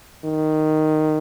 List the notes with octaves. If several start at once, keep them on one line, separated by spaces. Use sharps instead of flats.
D#3